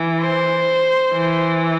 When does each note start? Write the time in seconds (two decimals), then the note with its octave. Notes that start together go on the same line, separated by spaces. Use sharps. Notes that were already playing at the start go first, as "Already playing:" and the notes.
Already playing: E3
0.21 C5
1.12 E3